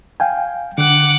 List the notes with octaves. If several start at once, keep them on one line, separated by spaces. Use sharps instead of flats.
F5 G5 G#5
D3 F#5 D6 F#6